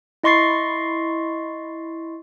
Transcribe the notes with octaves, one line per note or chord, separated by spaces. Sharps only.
E4 D#5 C6 C#6 A6 C7